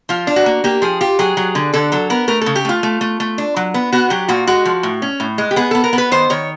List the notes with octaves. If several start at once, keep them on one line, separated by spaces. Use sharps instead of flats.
F3 F4
D4
F#4
A#3
A#3 G4
F3 G#4
F4 G4
F#3 G#4
F#3
D3
D3 A4
F#3 A4
B3 A#4
A3 A#4
C#3 A4
G4
A3 F4
A3
A3
A3
D4
F#3
B3
B3 F#4
F#3 G4
A#2 F#4
G#3 F#4
F3
A2
C#4
A2
G#3
G4
B3 G#4
B3 A4
A#4
B3
B4
D#3 C5
D#3 C#5